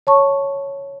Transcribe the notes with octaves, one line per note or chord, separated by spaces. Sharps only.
C#5 A5 C#6